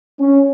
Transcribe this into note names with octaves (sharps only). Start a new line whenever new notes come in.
C#4